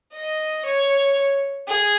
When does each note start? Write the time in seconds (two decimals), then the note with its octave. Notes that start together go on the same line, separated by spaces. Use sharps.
0.14 D#5
0.65 C#5
1.69 G#4